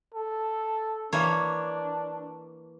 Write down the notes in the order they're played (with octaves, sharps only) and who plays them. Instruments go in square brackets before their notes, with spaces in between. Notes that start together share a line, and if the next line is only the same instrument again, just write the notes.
[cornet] A4
[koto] E3 A#3 C#5 [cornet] D4